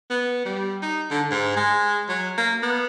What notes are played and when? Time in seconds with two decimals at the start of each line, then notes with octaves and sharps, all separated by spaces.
0.10 B3
0.46 G3
0.82 D#4
1.11 D3
1.31 G#2
1.57 G#3
2.09 F#3
2.38 A#3
2.62 B3